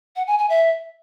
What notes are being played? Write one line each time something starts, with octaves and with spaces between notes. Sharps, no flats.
F#5
G#5
G#5
E5